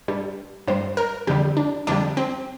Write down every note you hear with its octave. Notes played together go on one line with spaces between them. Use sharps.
G2 G3
G2 G3 C5
A#4
F2 D3 G3 G4
D4
F2 D3 G3 D4
C4